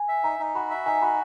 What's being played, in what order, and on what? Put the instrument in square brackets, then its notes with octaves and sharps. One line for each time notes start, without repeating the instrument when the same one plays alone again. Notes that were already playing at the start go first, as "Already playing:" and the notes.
Already playing: [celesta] G#5
[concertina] E5
[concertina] D#4 [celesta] A#5
[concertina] D#4
[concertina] F#4 [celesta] B5
[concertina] E5
[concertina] D#4 [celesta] G#5
[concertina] F#4 [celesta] B5